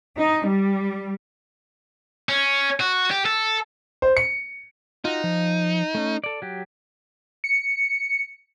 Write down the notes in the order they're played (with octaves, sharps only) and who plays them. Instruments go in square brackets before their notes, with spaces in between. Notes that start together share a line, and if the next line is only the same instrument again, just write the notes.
[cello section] D#4
G3
[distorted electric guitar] C#4
F#4
G4
A4
[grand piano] C5
C#7
[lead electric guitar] D#4 [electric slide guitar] F4 F#4
[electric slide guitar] F3
A3 C#4
A4 D5
F#3 G4
[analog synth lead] C#7